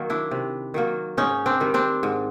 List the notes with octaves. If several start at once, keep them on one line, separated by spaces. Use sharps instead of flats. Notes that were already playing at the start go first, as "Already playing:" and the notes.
Already playing: D#3 F#3 A#3
D4 E4
C3
D#3 F#3 A#3
G#2 C#4 D#4
C4 D4
D#3 G3
C4 D4
G#2